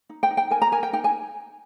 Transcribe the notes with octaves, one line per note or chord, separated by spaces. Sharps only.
D#4
G5
D#4
G5
A#4 G#5
A#5
A#4 G#5
G5
D#4 G5
G#5